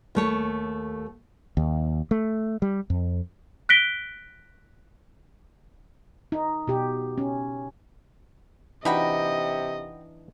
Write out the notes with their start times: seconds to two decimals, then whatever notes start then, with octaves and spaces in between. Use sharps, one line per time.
0.15 D#2 A3 C#5
1.57 D#2
2.11 A3
2.62 G3
2.90 F2
3.69 F#6 A#6 B6 D7 G7
6.32 D#4
6.67 B2 G4
7.18 C#4
8.85 C3 E3 D4 D#4 F#4 D#5 G5 B5